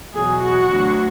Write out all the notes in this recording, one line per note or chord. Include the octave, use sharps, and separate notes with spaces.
E2 B2 F#3 G#4
F#4
D2 D3 F#3